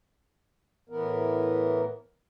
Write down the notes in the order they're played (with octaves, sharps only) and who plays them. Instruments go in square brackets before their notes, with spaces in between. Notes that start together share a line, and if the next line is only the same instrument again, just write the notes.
[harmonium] A2 E3 B3 A#4